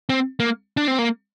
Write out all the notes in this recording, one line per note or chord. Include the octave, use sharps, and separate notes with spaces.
C4
A#3
D4
C4
A#3